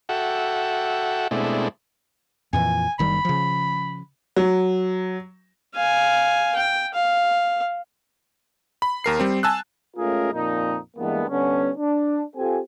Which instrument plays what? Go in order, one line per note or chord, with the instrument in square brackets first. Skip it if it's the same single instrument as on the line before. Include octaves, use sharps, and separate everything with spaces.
[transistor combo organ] F#4 A4 E5 F#5 G5
B2 G#3 A3 C4 D4 E4
[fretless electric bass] F2 A#2 E3 [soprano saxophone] G#5
[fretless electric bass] F#1 D#3 G3 [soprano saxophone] B5
[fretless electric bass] C#3 F3
[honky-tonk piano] F#3
[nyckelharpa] F5 G#5
G5
F5
[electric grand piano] B5
D#2 A#4 C7
G3 C4
G#5 A5 E6 F#6
[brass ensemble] G#3 A3 C#4 F4 G#4 A#4
F2 A#2 D#4
G2 E3 G#3 A#3 B3
D3 G3 B3 C#4
D4
C4 F4 G4 A4 G#5